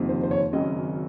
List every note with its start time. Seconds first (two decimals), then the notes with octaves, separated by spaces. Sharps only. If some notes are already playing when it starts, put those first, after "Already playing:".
Already playing: F#1 F2 C3 D#3
0.09 C5
0.23 C5
0.31 C#5
0.53 G#1 F#2 C#3 D#5